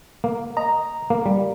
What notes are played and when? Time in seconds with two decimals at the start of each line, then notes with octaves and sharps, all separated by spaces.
0.24 A#3
0.57 D#5 A#5
1.10 A#3
1.26 G3